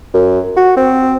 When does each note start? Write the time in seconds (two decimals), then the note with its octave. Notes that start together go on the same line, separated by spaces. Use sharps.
0.14 F#2
0.57 F#4
0.77 C4